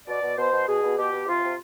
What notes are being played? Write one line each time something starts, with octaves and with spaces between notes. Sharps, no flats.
B2 D5
B2
B2 C5
B2
B2 G#4
B2
B2 G4
B2
C3 F4
C3